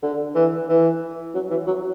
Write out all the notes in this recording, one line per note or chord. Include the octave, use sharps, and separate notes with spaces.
D3
E3
E3
F#3
E3
F#3